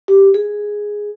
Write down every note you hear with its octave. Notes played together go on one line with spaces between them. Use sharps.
G4
G#4